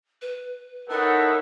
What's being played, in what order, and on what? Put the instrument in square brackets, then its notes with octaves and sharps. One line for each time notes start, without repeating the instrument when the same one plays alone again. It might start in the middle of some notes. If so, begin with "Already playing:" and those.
[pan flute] B4
[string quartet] D#4 E4 C#5 [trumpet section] A4 F#5 [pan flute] A#4